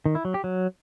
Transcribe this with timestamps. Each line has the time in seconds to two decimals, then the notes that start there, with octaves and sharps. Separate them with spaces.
0.06 D#3
0.15 E4
0.25 F#3
0.34 G4
0.44 F#3